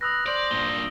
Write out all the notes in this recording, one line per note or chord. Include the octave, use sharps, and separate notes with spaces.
B4 D#6 E6 A#6
C5 D5 D7 F#7
G2 A#2 G7